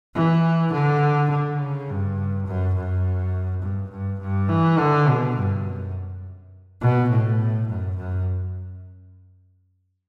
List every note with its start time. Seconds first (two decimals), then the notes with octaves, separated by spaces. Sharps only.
0.15 E3
0.73 D3
1.30 D3
1.59 C#3
1.88 G2
2.47 F#2
2.76 F#2
3.62 G2
3.91 G2
4.20 G2
4.49 E3
4.78 D3
5.07 B2
5.37 G2
5.66 F#2
6.81 B2
7.10 A2
7.69 F#2
7.97 F#2